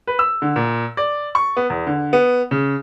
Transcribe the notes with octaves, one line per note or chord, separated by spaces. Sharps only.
B4
E6
D3
A#2
D5
C#6
B3
E2
D3
B3
C#3